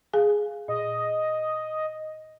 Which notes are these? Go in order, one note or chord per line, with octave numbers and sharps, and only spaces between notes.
G#4 F5 G#5
A#2 D#5